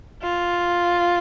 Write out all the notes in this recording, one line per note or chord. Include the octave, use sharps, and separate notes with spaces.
F4